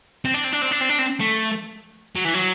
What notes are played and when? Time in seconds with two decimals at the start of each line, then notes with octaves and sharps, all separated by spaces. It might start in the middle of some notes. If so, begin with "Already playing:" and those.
0.25 C4
0.34 D4
0.44 C4
0.52 D4
0.61 C4
0.71 D4
0.81 C4
0.89 D4
0.99 C4
1.20 A3
2.16 F#3
2.25 E3
2.34 F#3